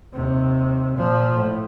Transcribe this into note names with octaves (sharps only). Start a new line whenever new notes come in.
D#2 C3
A#2 F3
A2